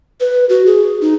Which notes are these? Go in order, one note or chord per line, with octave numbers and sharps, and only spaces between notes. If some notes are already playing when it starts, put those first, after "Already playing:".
B4
F#4
G#4
D#4